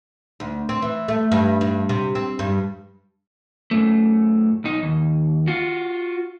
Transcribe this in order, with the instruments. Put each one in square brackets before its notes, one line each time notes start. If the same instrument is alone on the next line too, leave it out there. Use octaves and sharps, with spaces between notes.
[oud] D2
C4
E3
A3
G2
G2
C3
C4
G2
[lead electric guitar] F#2 A3
B1 D#4
D#2
F4 F#4